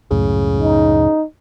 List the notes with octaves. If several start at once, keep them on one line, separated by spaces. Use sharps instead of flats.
C#2 F#2 A2 C#3
D#4